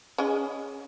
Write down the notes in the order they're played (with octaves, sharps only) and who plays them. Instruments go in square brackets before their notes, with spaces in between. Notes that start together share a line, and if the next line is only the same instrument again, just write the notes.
[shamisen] C#4 G#4 D#5